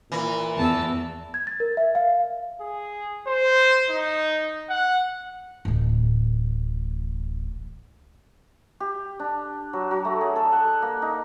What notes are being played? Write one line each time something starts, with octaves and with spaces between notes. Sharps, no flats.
A#2 E3
E2 A5 E6
G#6
A6
A#4
E5
F5
G#4
C5
D#4
F#5
D1 A1
G4
D4
F#3
F#3
A3
G#4
A4
F#5
A#3
D#4